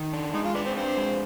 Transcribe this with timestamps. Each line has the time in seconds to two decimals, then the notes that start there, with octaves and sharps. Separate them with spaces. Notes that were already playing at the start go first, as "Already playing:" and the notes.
Already playing: D#3
0.13 D4
0.34 G#3 D#4
0.45 F4
0.55 D4 B4
0.66 C4
0.76 C4 D4
0.97 G#3